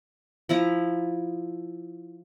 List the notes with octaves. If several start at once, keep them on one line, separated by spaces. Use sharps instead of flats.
F3 E4 A#5